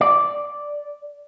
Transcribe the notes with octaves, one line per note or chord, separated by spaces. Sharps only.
D5